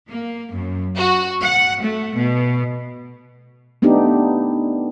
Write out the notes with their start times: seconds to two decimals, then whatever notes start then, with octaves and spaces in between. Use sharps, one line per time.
0.11 A#3
0.54 F#2
0.97 F#4
1.42 F#5
1.80 A3
2.16 B2
3.82 A3 B3 D4 D#4 G4